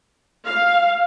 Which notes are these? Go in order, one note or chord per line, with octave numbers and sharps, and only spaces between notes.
F5